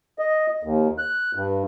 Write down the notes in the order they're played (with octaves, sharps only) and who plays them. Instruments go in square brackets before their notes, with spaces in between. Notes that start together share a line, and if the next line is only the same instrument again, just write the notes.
[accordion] D#5
D#2
F#6
G2